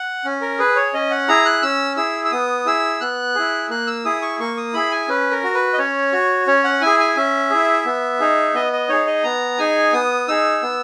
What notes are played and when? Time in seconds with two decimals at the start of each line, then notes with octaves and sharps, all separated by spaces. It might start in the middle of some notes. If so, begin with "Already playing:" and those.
Already playing: F#5
0.25 C#4
0.41 A#4
0.59 G#4 B4
0.76 C#5
0.94 C#4 D#5
1.11 F#5
1.28 E4 G#4 A#5
1.45 F#6
1.62 C#4 E6
1.97 E4 G#4 E6
2.25 E6
2.32 B3 D#6
2.66 E4 G#4 E6
3.01 B3 F#6
3.35 E4 G#4
3.70 A#3 F#6
3.87 E6
4.05 E4 G#4 D#6
4.22 C#6
4.40 A#3 C#6
4.57 D#6
4.74 E4 G#4 B5
4.91 G#5
5.08 C#4 B4
5.31 A#4
5.43 F#4
5.54 B4
5.73 D#5
5.78 C#4 C#5
6.13 F#4
6.47 C#4 C#5
6.64 F#5
6.81 E4 G#4 G#5
6.99 G#5
7.16 C#4 E5
7.50 E4 G#4
7.86 B3
8.20 D#4 G#4
8.54 B3 D#5
8.73 D#5
8.89 D#4 G#4 C#5
9.07 D#5
9.24 B3 A#5
9.58 D#4 G#4 G#5
9.93 B3 D#6
10.28 D#4 G#4 E6
10.62 B3